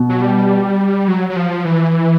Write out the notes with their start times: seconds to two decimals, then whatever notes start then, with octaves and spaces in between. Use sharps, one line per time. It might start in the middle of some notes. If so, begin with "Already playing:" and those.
Already playing: B2
0.09 F#3
0.21 G3
1.08 F#3
1.30 F#3
1.36 F3
1.65 E3